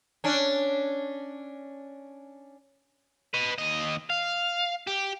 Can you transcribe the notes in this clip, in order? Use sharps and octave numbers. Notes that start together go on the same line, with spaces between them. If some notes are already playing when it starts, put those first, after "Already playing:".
C#4 D4
B4 D#5
D#2 D#5
F5
G4